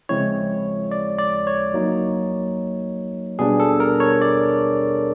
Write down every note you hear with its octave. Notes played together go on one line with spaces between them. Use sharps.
C#3 F3 G#3 C4 E4 C#5
D5
D5
C#5
F#3 A#3 D#4
B2 G3 B3 D4 G#4
A4
A#4
C#5
D5